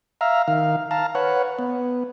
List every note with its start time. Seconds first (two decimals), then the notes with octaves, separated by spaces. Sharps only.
0.21 E5 F5 A#5
0.48 D#3 F5
0.91 F5 A5 A#5
1.15 B4 C#5 F#5
1.59 B3